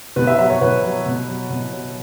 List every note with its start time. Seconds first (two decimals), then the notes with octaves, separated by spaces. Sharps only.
0.16 B2 B4
0.27 E5
0.39 F#3 E5
0.50 C#5
0.61 B2 B4
0.83 F#3
1.06 B2
1.28 F#3
1.50 B2
1.73 F#3